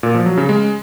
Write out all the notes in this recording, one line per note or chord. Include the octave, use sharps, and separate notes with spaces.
A#2
F3
F#3
C#3
G#3